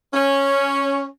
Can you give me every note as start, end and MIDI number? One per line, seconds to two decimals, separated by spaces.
0.14 1.04 61